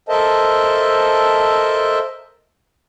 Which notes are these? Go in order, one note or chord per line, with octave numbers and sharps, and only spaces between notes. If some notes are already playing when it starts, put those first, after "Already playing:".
A4 A#4 C5 D#5 E5 A5